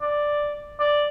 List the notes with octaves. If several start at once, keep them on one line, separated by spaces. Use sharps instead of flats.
D5
D5